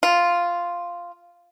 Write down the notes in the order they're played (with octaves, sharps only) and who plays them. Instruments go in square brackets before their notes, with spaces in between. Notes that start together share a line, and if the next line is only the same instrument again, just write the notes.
[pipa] F4